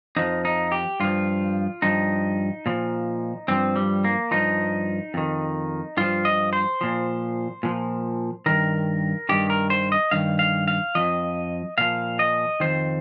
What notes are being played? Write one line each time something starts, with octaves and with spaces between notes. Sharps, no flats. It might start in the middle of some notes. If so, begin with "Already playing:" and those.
F2 F3 D#4
D#4
G4
G2 F3 F4
G2 F3 D#4
A#2 F3
G2 F3 C4
G3
A#3
G2 F3 D#4
F2 D#3
G2 F3 F4
D#5
C5
A#2 F3
A#2 F3
G2 D#3 A#4
G2 D#3 G4
A#4
C5
D#5
G2 D#3 F5
F5
F5
F2 F3 D#5
A#2 F3 F5
D#5
F2 D#3 C5